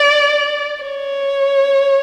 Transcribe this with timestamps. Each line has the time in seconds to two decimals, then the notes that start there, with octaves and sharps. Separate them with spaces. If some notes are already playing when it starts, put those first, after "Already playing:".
Already playing: D5
0.82 C#5